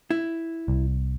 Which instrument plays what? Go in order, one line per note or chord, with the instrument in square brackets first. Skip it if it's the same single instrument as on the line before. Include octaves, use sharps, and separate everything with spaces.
[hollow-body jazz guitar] E4
[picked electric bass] C2